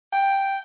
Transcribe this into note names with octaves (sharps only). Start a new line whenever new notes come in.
G5